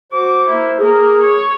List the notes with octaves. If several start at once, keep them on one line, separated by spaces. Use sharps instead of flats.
F#4 C5 D6
A#3 E4
A#3 G#4 A#4
C#5